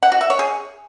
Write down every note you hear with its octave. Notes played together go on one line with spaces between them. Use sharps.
F#5
F#4
E5
C#5
G#4